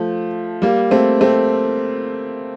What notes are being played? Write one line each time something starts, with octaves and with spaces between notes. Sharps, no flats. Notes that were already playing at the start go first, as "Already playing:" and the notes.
Already playing: F3 A3
G3 A#3
A3 C4
A3 C4